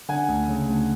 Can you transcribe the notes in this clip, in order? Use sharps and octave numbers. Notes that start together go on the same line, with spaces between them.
D3 F#5 G#5
D2
C#3
D2